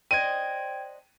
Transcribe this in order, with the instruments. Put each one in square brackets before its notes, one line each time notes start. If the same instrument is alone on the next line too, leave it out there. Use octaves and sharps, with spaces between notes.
[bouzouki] D4 C5 D#5 [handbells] G5 G#6 [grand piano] D#7